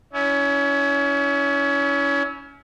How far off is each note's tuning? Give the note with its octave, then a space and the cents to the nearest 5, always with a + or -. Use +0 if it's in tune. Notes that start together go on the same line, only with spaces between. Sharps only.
C#4 +25 E4 -20